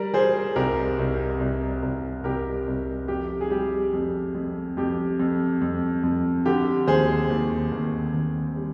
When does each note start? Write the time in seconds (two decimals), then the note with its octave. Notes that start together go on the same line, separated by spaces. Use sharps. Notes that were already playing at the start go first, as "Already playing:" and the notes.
Already playing: G3 A#4 D5
0.14 G3 G#4 C5
0.56 C2 G4 A#4
0.99 C2
1.40 C2
1.83 C2
2.24 C2 G4 A#4
2.67 C2
3.08 F2 G4
3.41 G#4
3.50 G3 G4
3.93 F2
4.35 F2
4.77 F2 G4
5.19 F2
5.62 F2
6.04 F2
6.46 D3 G4
6.87 D#2 G#4 C5
7.30 D#2
7.72 D#2
8.14 D#2
8.56 G3